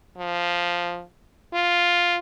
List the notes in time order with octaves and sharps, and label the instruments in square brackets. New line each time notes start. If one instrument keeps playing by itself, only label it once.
[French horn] F3
F4